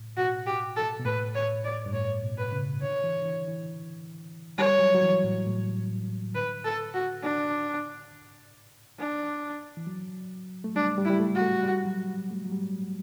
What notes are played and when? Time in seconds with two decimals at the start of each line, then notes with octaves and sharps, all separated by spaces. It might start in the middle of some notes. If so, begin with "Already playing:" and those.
Already playing: A2
0.17 B2 F#4
0.47 G4
0.77 A4
0.99 B2
1.05 A2 B4
1.35 C#5
1.64 D5
1.86 G2
1.93 A2 C#5
2.23 B2
2.38 B4
2.52 C#3
2.82 D3 C#5
3.04 E3
3.20 D3
3.26 E3
3.48 E3
4.58 G3 C#5
4.80 F#3
4.95 F#3
5.03 E3
5.24 A2
5.47 A2
6.35 D3 B4
6.65 A4
6.94 F#4
7.22 D4
8.99 D4
9.77 E3
9.87 F#3
10.64 A3
10.75 G3 D4
10.98 G3
11.05 E4
11.10 G3
11.20 A3
11.35 F#4
11.41 A3
11.63 G3
11.85 F#3
12.08 G3
12.30 A3
12.46 F#3
12.52 G3